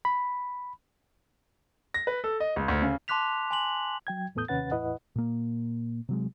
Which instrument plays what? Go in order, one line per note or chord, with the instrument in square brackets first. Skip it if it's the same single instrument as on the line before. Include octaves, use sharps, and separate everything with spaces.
[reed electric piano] B5
[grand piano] A#6
B4
A4
D#5
C#2
D2
C#3
[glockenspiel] A5 C6 D6 F#6 B6 F7
G#5 C6 F#7
[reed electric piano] F#3 G5 G#6
E2 A2 B3 A4 D#6 G6
D#2 C3 C#4 B4 F#5 A6
E2 A2 E4 B4 D#5 F#5
[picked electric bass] A#2 A#3
C3 F#3 G#3